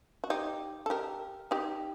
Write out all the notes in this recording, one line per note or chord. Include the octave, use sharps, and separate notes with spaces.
F#4
D#4 G4
A4
G4 A#4
D#4 G4